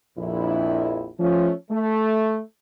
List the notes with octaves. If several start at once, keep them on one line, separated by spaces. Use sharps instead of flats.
A#1 F2 E4
F3 A3 C#4
A3